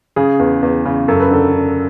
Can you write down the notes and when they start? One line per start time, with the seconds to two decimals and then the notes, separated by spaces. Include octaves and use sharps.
0.16 C#3 G#4
0.39 E2
0.62 E2
0.85 C#3
1.08 F#2 A4
1.20 B4
1.31 D3 A4
1.54 D3